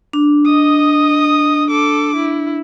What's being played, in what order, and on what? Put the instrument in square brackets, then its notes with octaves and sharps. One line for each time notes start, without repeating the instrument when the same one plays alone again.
[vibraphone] D4
[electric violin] D#5 D#6
A4 D6
E4